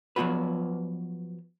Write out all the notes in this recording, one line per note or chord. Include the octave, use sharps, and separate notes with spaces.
F3 F#3 B3 F4 F#4 B4